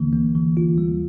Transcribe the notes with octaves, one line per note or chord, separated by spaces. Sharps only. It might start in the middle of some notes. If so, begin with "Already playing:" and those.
Already playing: D3 E3 A#3
A#3
E3
F4
G3